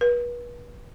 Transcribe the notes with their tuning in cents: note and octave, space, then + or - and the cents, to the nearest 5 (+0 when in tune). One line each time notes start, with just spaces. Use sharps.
B4 -35